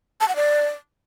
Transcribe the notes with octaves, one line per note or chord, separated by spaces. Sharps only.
A5
F#5
D5